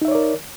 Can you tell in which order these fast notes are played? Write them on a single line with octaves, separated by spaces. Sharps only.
D#4 E5 C#5 D5 A#4